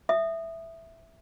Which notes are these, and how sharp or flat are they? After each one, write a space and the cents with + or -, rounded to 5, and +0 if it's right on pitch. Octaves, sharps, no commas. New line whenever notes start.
E5 +0 D#6 -15